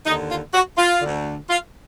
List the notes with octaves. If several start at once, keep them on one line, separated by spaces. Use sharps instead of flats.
D#2 D3 D#4
F4
F#4
F4
D2 D3
F4